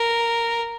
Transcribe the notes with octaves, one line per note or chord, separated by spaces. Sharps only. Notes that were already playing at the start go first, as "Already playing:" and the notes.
Already playing: A#4